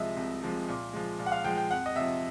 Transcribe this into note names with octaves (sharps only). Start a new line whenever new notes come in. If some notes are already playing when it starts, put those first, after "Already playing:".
Already playing: C2 C3 F3 G#3 D#5 E5
C2
C3 F3 G#3
A#2
F3 G#3
A#2
F#5
F5
F3 G#3 G5
G5
F2 F#5
D#5
C3 F3 E5